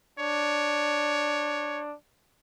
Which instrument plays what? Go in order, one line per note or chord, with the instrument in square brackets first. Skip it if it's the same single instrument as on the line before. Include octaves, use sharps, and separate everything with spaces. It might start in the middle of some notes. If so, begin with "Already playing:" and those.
[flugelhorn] D4 [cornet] C#5